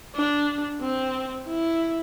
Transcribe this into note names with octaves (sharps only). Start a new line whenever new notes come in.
D4
C4
E4